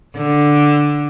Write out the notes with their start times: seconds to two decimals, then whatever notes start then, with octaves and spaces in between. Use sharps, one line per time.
0.16 D3